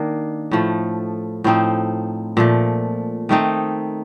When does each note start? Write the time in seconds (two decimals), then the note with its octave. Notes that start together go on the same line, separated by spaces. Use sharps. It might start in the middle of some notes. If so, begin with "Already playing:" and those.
Already playing: D#3 A#3 D4
0.51 A2 F3 A3
1.44 A2 F3 C4 D#4
2.37 A#2 F3 A3
3.29 D#3 A3 C4 D#4